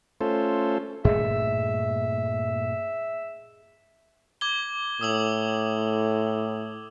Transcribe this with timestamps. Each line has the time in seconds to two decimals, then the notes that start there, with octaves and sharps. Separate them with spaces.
0.21 A3 C#4 F4 A4 C5
1.05 G2 A#2 A3 G#4 D#5 E5
4.41 D6 G#6 G7
5.01 A2 D#6 E6 F#7